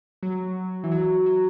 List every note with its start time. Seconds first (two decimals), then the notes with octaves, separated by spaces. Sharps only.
0.23 F#3
0.84 E3
0.91 F#3
1.26 F#3